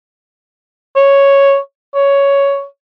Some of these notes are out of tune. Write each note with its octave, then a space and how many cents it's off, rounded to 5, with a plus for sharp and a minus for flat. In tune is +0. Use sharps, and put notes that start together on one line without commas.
C#5 +0
C#5 +10